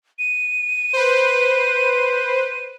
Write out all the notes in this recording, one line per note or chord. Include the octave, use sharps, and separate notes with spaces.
D#7
B4 C5